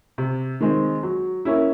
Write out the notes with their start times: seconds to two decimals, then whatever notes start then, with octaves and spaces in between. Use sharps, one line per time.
0.18 C3
0.60 D#3 G#3 C4
1.03 F#3
1.45 A#3 C#4 E4